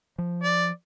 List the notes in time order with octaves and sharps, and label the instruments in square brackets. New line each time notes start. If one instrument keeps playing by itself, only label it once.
[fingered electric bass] F3
[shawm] D5